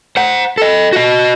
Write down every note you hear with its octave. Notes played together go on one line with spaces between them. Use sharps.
C5 F#5
A4 D#5
F#4 D#5